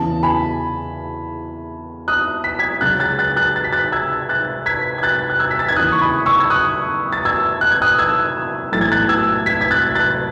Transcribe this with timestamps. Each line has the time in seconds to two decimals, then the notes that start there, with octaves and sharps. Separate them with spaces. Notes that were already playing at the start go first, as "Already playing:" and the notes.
Already playing: E2 C#3 E3 A5
0.23 G#5 B5
2.08 D#6 F#6
2.44 B6
2.59 G#6 B6
2.81 C#2 C#3 F#3 F#6 A6
3.00 F#6 A6
3.19 F#6 A6
3.36 F#6 A6
3.56 A6
3.64 B6
3.73 F#6 A6
3.92 E6 G#6
4.29 F#6 A6
4.66 G#6 B6
4.98 G#6
5.03 F#6 A6
5.30 F#6
5.39 E6 G#6
5.51 B6
5.59 A6
5.69 G#6
5.76 D#2 C#3 E3 D#6 F#6
5.92 C#6
6.01 B5 D#6
6.26 C#6 E6
6.40 G#6
6.50 D#6 F#6
7.13 A6
7.25 E6 G#6
7.61 F#6
7.72 G#6
7.82 D#6 F#6
7.98 E6 G#6
8.72 B1 A2 E3 A6
8.81 G#6
8.92 F#6 A6
9.09 E6 G#6
9.46 G#6 B6
9.61 G#6
9.71 F#6 A6
9.95 F#6 A6